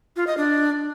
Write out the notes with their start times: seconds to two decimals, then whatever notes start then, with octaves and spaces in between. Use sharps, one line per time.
0.16 F4
0.27 D#5
0.38 D4